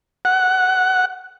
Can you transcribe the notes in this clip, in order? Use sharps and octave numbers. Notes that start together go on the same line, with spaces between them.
F#5